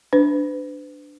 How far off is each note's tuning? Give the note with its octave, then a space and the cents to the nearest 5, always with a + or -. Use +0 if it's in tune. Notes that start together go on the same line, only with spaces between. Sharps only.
D4 +0 B4 +40